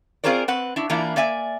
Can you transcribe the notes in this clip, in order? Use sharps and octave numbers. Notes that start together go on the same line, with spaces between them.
C4 F4 G#4 A#4 C5 D5
C4 B4 F#5
D4 E4
E3 A#3 D4 E4 F4
A#3 D5 E5 G#5